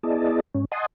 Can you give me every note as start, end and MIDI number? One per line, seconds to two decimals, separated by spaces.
0.03 0.40 59
0.03 0.40 64
0.03 0.40 68
0.03 0.40 74
0.03 0.40 75
0.03 0.40 81
0.54 0.65 44
0.54 0.65 61
0.72 0.86 75
0.72 0.86 78
0.72 0.86 80
0.72 0.86 81
0.72 0.86 84
0.72 0.86 87